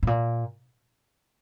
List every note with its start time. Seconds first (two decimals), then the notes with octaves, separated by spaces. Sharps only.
0.03 A2
0.07 A#2